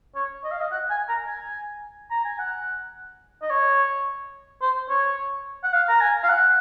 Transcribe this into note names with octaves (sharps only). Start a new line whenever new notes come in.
C#5
D#5
F5
D#5
F#5
G#5
A#5
G#5
A#5
G#5
F#5
D#5
C#5
C5
C#5
F#5
F5
A#5
G#5
F5
F#5